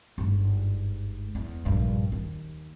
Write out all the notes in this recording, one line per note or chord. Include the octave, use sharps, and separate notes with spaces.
G1 G#2
E2
A#1 G2
D#2